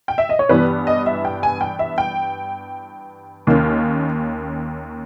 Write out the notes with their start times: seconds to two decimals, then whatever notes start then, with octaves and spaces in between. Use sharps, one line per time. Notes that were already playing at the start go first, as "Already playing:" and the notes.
0.08 G5
0.18 E5
0.29 D#5
0.39 C#5
0.49 G2 E3 G3 B3 B4
0.87 D#5
1.06 E5
1.25 G5
1.43 G#5
1.61 G5
1.79 E5
1.98 G5
3.47 D#2 D#3 A#3 C#4